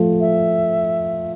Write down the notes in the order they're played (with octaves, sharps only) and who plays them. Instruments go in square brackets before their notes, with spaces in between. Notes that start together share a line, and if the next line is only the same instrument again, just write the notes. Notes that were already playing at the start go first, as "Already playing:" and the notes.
Already playing: [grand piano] F3 A3
[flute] E5